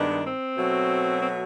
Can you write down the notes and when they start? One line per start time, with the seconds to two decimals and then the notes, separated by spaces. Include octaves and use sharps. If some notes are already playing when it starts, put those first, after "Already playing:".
Already playing: G2 D#3 G#3 B3 D4
0.26 C4
0.57 B2 F#3 A3
1.22 C4